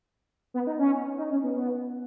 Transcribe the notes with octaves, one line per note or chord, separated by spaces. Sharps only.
B3
D#4
C#4
D#4
C#4
B3
B3